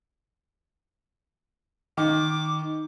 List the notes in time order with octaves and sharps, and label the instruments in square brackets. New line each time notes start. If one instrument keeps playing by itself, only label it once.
[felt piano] D#3 [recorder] D6